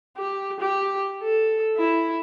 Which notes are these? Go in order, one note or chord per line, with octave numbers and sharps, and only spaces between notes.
G4
G4
A4
E4